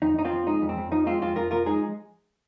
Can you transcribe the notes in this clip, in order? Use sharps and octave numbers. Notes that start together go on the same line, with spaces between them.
F2 D#4
F2 D#4
C4 F4
F3
G#3 D#4
F2
C4
F2
F3 D#4
G#3 C4 F4
F2 C4 F4
F2 F4 A#4
F3 F4 A#4
G#3 D#4 G#4